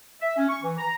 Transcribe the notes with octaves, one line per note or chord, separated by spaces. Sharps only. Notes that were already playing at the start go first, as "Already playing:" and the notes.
E5
C#4
C#6
E3
A#5